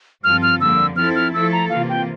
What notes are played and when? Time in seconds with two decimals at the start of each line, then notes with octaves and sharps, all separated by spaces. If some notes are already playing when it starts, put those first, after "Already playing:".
0.24 G2 F3 C4 F4 A4 F6
0.42 F6
0.60 F2 D3 G3 A#3 E6
0.96 F3 C4 E4 A4 F6
1.15 F6
1.33 F3 A3 E4 A4 E6
1.52 A#5
1.70 C3 E3 A#3 F4 F5
1.89 G5